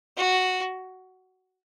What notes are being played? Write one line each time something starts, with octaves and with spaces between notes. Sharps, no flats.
F#4